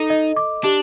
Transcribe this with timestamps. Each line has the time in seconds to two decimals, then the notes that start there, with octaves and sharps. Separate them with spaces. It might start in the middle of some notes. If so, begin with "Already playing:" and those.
Already playing: D#4 A4
0.10 D#5
0.37 D6
0.64 D4 G4